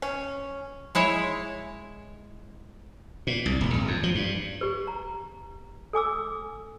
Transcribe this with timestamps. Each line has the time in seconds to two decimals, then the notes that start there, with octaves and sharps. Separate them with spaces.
0.02 C#4
0.95 G#3 E4 C#5
3.27 A#2
3.46 C2
3.61 D#1
3.74 G#1
3.88 F2
4.03 F3
4.15 G2
4.61 G4 B4
4.87 A#5
5.93 A4 G#5 D6 E6